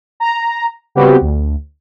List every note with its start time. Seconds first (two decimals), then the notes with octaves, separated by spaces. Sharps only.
0.20 A#5
0.95 C#3 G3 B3 C4 F#4 G4
1.21 D2